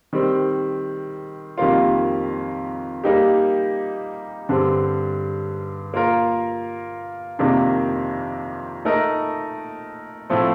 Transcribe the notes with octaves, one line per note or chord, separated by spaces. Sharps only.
D#3 G3 C4
F2 D#3 G3 A#3 F4
G3 A#3 D#4 G4
G2 D3 G3 C4
A#3 F4 A#4
F2 C3 D#3 A#3 D4
A3 D#4 A#4 D#5
A2 F3 A3 C4